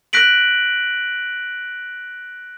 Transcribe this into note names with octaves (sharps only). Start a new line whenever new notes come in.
F#6 A#6 B6 D7 F#7